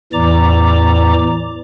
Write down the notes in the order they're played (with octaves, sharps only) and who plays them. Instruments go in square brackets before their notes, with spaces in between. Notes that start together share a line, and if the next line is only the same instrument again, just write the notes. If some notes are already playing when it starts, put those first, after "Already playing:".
[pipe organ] E2 A2 E3 D5 A#5 D6